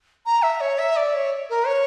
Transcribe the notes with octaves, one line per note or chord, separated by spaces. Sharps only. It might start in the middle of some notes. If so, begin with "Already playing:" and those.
A#5
E5
C#5
E5
D5
C#5
A#4
C#5